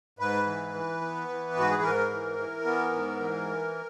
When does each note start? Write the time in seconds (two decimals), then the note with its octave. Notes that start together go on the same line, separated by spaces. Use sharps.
0.19 G#2 B4
0.46 E3
0.74 E3
1.01 B3
1.28 E3
1.56 G#2 F#4
1.71 G#4
1.83 G#2 A#4
2.10 E3
2.38 E3
2.65 B3
2.92 G#2
3.20 E3